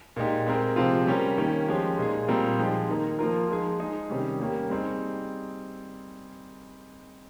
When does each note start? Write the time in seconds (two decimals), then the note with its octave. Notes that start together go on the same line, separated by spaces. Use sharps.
0.16 A#2 G#3 D#4 G4
0.46 G#3 C4 G4 A#4
0.76 C3 F3 G#3 C4 F4
1.07 G3 C#4 G4 A#4
1.38 D#3 A#3 C#4 G4
1.68 F3 G#3 C#4 G4
1.98 A#2 G#3 D#4 G#4
2.28 A#2 G3 C4 F4 A#4
2.59 F3 G#3 D#4 G4
2.89 D#3 A#3 D#4 A#4
3.19 F3 A#3 F4 A#4
3.49 F3 G#3 D#4 G#4
3.79 G#3 D#4 G#4
4.10 C3 D#3 G3 C#4
4.40 G3 A#3 C#4 G4
4.70 G3 C4 D#4 G#4